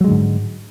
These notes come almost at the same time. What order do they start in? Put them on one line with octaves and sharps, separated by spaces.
F#3 G#3 D3 G#2